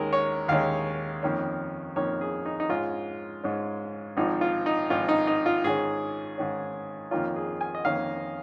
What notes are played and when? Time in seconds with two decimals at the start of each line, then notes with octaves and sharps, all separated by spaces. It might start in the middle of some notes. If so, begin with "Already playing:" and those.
Already playing: D#2 D#3 G#3 C#4 A#4
0.13 C#5
0.48 D#2 D#3 G#3 C#4 F5
1.23 F2 D#3 A#3 C#4
1.96 F2 D#3 A#3 C#4 C#5
2.21 G#4
2.46 D#4
2.60 D#4
2.69 G#2 G#3 C#4 F4
3.43 G#2 G#3 C#4
4.17 G#1 G#2 F3 D#4
4.41 F4
4.66 D#4
4.90 G#1 G#2 F3 F4
5.09 D#4
5.27 D#4
5.46 F4
5.64 G#2 D#3 C#4 G#4
6.38 G#2 D#3 C#4
7.11 F2 D#3 A#3 C#4 F4
7.36 G#4
7.61 G#5
7.75 D#5
7.85 F2 D#3 A#3 C#4 F5